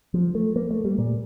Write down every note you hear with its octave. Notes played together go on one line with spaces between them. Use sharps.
F3
A3
A#3
A3
G3
A#2